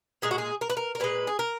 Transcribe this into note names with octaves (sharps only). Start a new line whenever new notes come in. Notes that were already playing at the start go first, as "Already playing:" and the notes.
A#2 G#3 G#4
F#4
G#4
A#4
B4
A#4
A#4
A#2 G#3 B4
G#4
A#4